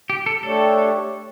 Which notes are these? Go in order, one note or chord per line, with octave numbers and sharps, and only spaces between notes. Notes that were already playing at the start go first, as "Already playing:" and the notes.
G4
A4
A3 D4 G4 A4 C#5